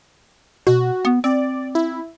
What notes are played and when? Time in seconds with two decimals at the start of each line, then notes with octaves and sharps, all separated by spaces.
0.67 B2 F#4
1.05 B3
1.24 C4 D5
1.75 E4